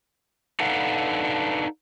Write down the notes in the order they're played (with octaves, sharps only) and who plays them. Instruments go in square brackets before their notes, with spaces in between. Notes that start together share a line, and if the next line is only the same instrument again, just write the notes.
[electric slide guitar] D4 D#4 A4 B4 F5 F#5